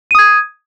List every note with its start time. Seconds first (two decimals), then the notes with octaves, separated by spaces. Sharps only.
0.11 D#7
0.15 D#6
0.19 G#6